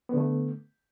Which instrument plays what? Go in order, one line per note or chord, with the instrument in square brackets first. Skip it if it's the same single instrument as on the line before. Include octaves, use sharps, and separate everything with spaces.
[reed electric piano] B3
D3
A3